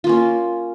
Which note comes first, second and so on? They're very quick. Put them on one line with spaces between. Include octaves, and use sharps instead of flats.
F4 A#3 C#4